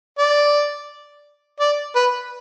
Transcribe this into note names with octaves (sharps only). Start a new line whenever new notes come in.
D5
D5
B4